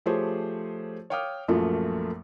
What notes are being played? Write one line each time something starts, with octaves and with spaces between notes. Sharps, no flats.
F3 A3 G4 G#4 C5 C#5
C#5 F5 G5 D6 D#6 F6
A#1 F#2 F3 A3 A#3 F4